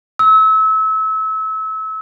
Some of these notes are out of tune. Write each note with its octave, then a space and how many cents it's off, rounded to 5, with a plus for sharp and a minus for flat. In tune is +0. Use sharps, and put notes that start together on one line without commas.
E6 -30